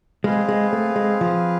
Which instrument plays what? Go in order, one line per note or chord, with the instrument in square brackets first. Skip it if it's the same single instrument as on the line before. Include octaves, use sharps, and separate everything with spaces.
[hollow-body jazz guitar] G#3 [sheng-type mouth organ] C4 G#4 B4 F5
[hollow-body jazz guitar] G#3
A3
G#3
F3